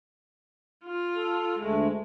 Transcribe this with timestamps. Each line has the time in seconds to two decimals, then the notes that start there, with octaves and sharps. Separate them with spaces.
0.84 F4
1.15 A4
1.59 D2 G#3 A3